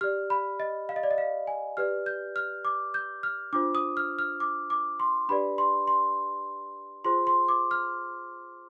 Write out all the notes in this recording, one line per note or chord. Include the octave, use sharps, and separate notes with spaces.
G4 D5 F6
B5
D#5
F5
D#5
D5
D#5
F5
G#5
G4 B4 D5 F6
G6
F6
D6
G6
F6
D4 F4 C5 D6
D#6
F6
F6
D6
D6
C6
D4 G4 B4 D5 B5
C6
C6
F4 G#4 C5 C6
C6
D6
F6